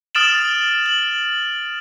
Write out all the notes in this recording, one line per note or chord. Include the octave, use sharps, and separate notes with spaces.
D#6 F6 A6 D7 E7 F#7
F#7